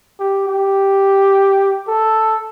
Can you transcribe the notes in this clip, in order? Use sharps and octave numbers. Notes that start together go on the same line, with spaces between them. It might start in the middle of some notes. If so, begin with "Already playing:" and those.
G4
G4
A4